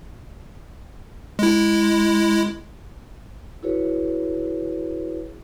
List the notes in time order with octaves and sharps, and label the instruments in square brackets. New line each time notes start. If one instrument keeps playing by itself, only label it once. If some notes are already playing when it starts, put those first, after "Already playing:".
[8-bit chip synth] G#3 E4
[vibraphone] E4 F#4 G#4 B4 C#5